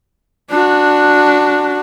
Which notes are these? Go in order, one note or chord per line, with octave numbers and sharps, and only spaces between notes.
D4 F#4